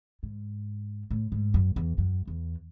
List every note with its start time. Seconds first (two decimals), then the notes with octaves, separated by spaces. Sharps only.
0.23 G#2
1.11 A2
1.32 G#2
1.54 F#2
1.76 E2
1.98 F#2
2.28 E2